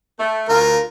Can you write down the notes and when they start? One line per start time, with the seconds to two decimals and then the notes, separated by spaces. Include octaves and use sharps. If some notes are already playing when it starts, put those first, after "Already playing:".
0.19 A3
0.49 D2 F4 A#4